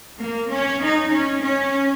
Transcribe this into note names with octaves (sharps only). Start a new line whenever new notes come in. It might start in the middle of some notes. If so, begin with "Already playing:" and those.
A#3
C#4
D#4
C#4
C#4